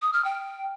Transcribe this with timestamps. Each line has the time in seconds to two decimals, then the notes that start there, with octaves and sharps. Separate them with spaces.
0.02 D#6
0.13 F6
0.25 G5